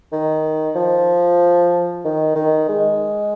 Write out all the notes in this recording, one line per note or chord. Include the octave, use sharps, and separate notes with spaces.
D#3
F3
D#3
D#3
G#3